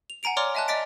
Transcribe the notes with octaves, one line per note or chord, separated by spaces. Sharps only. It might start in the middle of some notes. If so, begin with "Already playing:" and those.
F7
F#5 G#5 A#5 D7 F7
C#5 D5 A#5 C6 D6 F6
D#5 E5 G#5 A5 F#6
D5 D#5 D6 A6 B6 D7